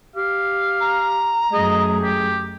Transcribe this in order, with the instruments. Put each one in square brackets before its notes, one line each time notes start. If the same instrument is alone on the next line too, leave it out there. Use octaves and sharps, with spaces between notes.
[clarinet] G4 [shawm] F5
[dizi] A#5
[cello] F#2 A3 [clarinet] G#4 [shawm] D#5
[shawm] G4